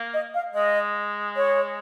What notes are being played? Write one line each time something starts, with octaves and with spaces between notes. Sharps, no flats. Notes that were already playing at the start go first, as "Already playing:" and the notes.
Already playing: A#3
D#5
F5
G#3 D#5
C#5